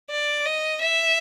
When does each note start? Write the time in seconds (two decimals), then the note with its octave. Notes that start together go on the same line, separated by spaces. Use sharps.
0.10 D5
0.46 D#5
0.82 E5